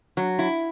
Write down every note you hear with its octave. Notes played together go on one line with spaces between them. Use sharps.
F#3
E4